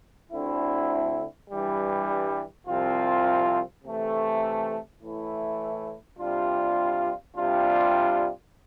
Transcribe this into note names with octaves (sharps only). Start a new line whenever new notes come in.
D2 D3 A3 C4 E4
G2 E3 G3
C2 C3 F3 C4 F4
C3 E3 A3
A2 E3 A3 E4
C3 G3 D4 F4
C3 G3 D4 F4